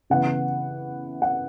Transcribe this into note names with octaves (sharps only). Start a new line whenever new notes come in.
C#3 E3 B3 F#5
F#5